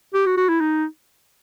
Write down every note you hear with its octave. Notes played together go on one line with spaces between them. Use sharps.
G4
F#4
F#4
E4
D#4